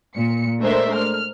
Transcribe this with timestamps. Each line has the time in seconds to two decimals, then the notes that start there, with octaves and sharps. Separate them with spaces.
0.16 A#2 C#7
0.61 G#3 A3 D4 A#4 C5 E5
0.94 F6